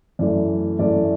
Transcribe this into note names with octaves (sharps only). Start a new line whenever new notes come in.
F#2 E3 A3 D5
F#2 E3 A3 D5